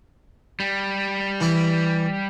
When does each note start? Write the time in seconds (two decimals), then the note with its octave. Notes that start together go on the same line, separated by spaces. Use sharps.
0.60 G3
1.41 E3 E4